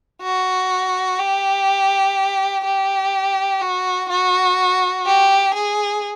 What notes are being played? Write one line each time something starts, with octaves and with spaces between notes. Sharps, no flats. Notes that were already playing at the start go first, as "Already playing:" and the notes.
F#4
G4
G4
F#4
F#4
G4
G#4